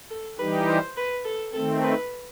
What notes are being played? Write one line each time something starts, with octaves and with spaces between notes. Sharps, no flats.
A4
E3 G3 D#4 G4 B4
C5
B4
A4
D#3 A3 C4 A4
B4